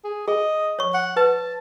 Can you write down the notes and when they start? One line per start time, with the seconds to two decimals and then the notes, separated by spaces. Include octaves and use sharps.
0.04 G#4
0.28 G#4 D#5
0.79 C#5 C#6
0.94 F#5
1.16 B4 A5